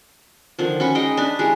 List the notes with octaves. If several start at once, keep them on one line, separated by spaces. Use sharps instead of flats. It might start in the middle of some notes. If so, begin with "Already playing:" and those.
D3 D#3 F3
C#4 F#4 B5 C#6
G#3 D#4 D#5 G5
D4 B4
G#3 E4 G4